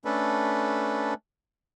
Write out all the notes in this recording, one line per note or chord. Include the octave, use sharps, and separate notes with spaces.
A3 C#4 D4 A4 B4